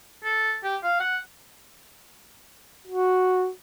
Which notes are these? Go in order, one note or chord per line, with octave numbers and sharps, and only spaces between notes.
A4
G4
F5
F#5
F#4